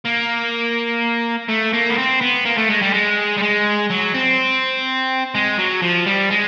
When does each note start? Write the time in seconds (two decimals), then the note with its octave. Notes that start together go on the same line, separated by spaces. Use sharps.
0.05 A#3
1.49 A3
1.73 A#3
1.90 B3
1.98 C4
2.21 B3
2.45 A#3
2.57 A3
2.70 G#3
2.82 G3
2.93 G#3
3.37 G3
3.42 G#3
3.90 F#3
4.14 C4
5.35 G#3
5.58 F#3
5.82 F3
6.07 G3
6.31 G#3